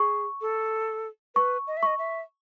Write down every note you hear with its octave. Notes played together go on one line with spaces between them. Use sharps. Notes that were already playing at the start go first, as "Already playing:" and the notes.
Already playing: G#4 C#6
A4
B4 C#6
D#5
E5
D#5 C#6
E5